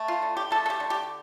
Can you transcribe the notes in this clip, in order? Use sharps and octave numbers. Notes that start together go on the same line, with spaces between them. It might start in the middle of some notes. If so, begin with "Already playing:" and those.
Already playing: A3
F4
D3
G4
A3 A4
A4
G4
D3
G4